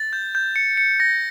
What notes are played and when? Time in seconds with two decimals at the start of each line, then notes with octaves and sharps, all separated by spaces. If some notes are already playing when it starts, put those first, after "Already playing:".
Already playing: A6
0.13 G6
0.35 G6
0.56 C#7
0.77 C#7
1.00 A#6